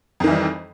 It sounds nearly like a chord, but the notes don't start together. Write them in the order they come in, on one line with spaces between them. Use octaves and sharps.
F2 D#3 E3 G3